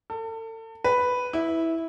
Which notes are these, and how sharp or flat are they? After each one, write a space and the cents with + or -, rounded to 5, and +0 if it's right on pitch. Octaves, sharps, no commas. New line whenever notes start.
A4 +35
B4 +5
E4 -10